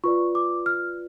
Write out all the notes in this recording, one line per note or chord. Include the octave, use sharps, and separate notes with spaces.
F4 B4 D5 C#6
D6
F6